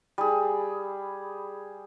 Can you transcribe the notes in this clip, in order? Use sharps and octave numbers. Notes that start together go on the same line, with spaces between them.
G3 G#4